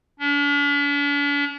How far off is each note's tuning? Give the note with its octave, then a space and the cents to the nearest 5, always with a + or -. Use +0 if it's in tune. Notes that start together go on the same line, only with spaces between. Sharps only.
D4 -45